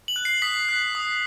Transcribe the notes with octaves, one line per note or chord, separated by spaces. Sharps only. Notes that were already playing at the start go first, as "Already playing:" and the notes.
F#7
F#6
C7
D#6 B6
F#6
D#6